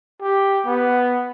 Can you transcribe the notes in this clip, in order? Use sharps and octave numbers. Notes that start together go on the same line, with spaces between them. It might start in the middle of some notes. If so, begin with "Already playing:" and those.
G4
B3